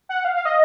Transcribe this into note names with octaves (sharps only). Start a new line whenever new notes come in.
F#5
F5
F5
D#5